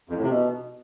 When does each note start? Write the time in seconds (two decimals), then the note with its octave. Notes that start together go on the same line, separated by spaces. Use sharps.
0.09 F2
0.16 A2
0.23 C3
0.29 B2